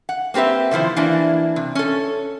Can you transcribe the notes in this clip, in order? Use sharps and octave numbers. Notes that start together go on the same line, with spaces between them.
F#5
A#3 C4 G4 B4 E5
C3 D#3 F3 E4 C5
E3 A#3 D4 E4
C3
C#4 A4